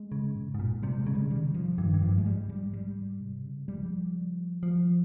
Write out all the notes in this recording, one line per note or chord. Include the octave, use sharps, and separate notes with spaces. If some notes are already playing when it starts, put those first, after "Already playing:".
Already playing: G#3
C#3
G#2
G#2
A#2
C3 G3
G#3
C#3
G3
D#3 G3
C3
F3
G2 D#3
G2
F3
G#2
G#3
G3
G3
G3
C3
C#3
F3 G3
F3